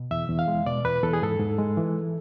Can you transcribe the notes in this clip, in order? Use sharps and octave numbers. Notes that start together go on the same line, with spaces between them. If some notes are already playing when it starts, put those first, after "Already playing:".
Already playing: B2
E2 E5
E2
F5
G#3
B2 D5
E2 B4
E2 A4
G#4
G#2 A4
G#2
G#3
E3